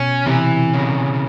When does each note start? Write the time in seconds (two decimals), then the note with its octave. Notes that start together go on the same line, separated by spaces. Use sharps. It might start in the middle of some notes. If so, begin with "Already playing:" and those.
Already playing: B2 C#4
0.26 C3 E3
0.73 C#3